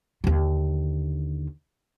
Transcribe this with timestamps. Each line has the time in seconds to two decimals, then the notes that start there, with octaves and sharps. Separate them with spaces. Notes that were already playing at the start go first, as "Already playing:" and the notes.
0.24 D#2 D3